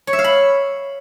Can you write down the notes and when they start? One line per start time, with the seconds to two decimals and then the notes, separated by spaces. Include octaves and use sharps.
0.07 C#5
0.13 E5
0.19 F5
0.24 B5